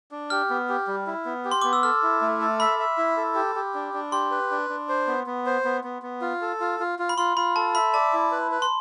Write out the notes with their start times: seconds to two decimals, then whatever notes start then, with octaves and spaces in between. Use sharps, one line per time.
0.11 D4
0.30 G4 F6
0.50 B3
0.69 G4
0.87 G3
1.07 E4
1.25 B3
1.45 G4
1.51 C6
1.61 B3 D6
1.73 E6
1.83 A4 F6
2.03 E4
2.21 A3
2.41 A4
2.60 E5 B5
2.79 E5
2.98 E4
3.17 A4
3.35 G4
3.55 G4
3.74 D4
3.94 D4
4.12 G4 C6
4.31 B4
4.51 D4
4.70 D4
4.89 C5
5.07 B3
5.27 B3
5.46 C5
5.65 B3
5.84 B3
6.02 B3
6.21 F4
6.42 A4
6.60 F4
6.80 F4
6.99 F4
7.09 B5
7.18 F4 C6
7.37 F4 B5
7.56 A4 A5
7.75 E5 B5
7.94 D5 A5
8.13 E4
8.32 B4
8.51 B4
8.62 C6